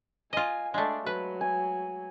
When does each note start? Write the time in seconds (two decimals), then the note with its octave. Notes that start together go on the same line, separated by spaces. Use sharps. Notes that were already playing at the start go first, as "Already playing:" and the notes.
0.33 F4 D#5 G#5
0.74 G#3 A3 D4
1.06 F#3 B4
1.41 G#5